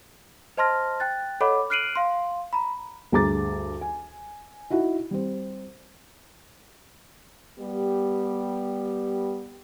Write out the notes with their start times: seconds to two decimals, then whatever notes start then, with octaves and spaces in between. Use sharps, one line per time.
0.57 C5 D#5 A5 C6 F6 A#6
1.00 G5 F#6 A6
1.41 A4 C#5 D#5 F#5 B5 D6
1.70 F6 F#6 C7 D7 D#7 F#7
1.96 F5 C6
2.53 A#5 B5
3.12 D2 G2 G#4 A#5 D6 A6
3.81 G#5
4.70 D#4 E4 F#4
5.11 G3 C4
7.59 G3 B3 G4